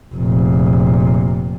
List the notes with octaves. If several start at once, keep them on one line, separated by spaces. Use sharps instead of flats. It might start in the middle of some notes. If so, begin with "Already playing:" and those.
F1 A#2